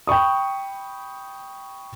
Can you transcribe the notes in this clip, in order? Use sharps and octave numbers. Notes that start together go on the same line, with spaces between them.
G5 B5 C#6 D#6